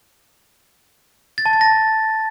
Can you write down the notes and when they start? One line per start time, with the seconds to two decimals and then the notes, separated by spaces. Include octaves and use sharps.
1.38 A6
1.46 A5
1.53 A6
1.61 A#6